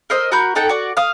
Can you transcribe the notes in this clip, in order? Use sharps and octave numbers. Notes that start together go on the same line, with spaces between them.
A#4 C5 D#5 E6
F#4 A#4 B5 G6
D#4 A4 F#5 G5
F#4 D5
F5 D#6